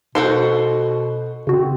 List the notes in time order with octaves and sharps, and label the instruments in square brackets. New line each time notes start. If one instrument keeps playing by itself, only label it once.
[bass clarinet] B2 [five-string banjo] F#4 A4 C5
[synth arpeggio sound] C#3 F#4 [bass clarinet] C4